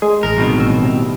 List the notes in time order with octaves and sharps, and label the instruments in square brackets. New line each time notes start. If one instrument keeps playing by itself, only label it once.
[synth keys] G#3
[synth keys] A1 [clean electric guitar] A#4
[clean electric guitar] C2 B2 D#3
[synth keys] A1 E6
C3